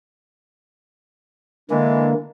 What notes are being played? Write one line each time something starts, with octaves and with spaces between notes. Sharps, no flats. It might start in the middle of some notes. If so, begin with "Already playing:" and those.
D3 E3 G#3 A#3 D4